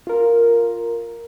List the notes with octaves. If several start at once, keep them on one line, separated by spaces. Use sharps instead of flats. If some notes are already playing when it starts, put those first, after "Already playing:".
F4 A#4